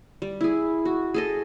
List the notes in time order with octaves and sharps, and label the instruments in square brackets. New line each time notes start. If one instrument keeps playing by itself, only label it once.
[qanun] G3
E4 G#4
F#4
G#4 A4 D#5